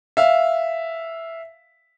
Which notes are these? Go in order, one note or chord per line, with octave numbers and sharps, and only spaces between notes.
E5 F5